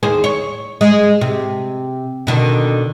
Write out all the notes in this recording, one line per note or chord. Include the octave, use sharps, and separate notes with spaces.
D#2 G#4 C5
C#5
G#3
C3
B2 D3 D#3